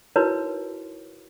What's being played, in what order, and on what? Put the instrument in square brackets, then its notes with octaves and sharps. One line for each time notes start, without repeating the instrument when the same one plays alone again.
[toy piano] D#4 E4 F#4 A#4 B4 C#5